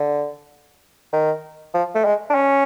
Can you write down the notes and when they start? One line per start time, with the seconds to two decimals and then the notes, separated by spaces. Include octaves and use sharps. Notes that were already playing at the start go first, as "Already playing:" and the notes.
Already playing: D3
1.13 D#3
1.74 F3
1.95 A3
2.05 G#3
2.30 D4
2.35 C#4